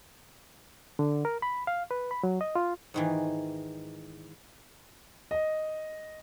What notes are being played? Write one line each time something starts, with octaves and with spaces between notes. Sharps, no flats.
D3
A#4
B5
F5
B4
B5
F#3
D#5
F4
G#2 D#3 E3
D#5